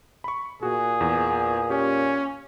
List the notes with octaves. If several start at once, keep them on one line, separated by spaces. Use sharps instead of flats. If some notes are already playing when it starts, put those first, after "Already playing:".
B5 C#6
A#2 F#4 G#4
E2
C#4 G4